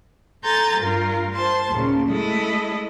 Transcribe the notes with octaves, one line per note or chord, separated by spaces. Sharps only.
A4 G#5 A#5 C6 G6 A6
G2 F4 A#4
C5 A5 C6
D#2 A#2 C#3
G#3 A3 E4 A4 D#5